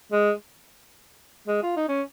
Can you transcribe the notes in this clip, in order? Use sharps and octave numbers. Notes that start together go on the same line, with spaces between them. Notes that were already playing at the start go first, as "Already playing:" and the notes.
G#3
G#3
F4
D#4
C#4